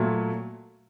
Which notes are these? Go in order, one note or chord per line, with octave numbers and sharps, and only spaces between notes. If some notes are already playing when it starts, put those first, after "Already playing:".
Already playing: A#2 F#3 A3